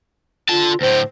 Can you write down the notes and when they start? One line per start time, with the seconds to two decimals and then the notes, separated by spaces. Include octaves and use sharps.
0.49 D3 F4 A5
0.81 D2 A2 C5